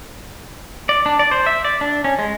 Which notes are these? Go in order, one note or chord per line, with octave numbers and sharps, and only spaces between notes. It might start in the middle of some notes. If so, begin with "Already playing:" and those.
D5
D4
D5
C5
E5
D5
D4
C#4
G#3